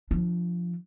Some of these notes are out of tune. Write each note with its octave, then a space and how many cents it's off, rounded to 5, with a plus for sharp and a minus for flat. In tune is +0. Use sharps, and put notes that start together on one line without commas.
F3 +0 D4 +30